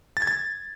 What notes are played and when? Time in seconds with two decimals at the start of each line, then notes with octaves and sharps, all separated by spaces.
0.17 A6
0.22 G#6
0.27 A6